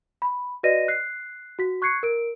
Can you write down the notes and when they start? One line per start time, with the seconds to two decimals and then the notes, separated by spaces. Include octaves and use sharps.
0.22 B5
0.63 F#4 B4 D5 D#5 A#6 D#7
0.88 F#6 C7
1.59 F#4 B6
1.82 C#6 F#6 G#6 C7 C#7
2.03 A#4 D7